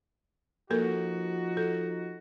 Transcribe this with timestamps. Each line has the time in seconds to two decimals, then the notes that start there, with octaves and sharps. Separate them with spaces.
0.70 F3 A#3 D#4 F#4 A4 A#4
1.57 A4